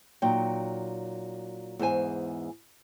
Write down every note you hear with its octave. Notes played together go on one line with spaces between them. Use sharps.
A#2 F#3 D#4 G5
E2 G#2 C5 G#5